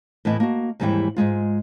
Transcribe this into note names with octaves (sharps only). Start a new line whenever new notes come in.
A2 E3 B3 E4 D#5
A#3 F#4
D#2 G#2 E3 G3 E4 G5
G#2 C#3 G#3 F4